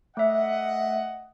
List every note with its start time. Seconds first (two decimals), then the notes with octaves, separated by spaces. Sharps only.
0.17 A3 D#5 E5 F#5